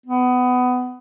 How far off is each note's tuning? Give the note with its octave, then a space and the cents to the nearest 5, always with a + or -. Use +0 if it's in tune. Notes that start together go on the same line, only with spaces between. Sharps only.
B3 +20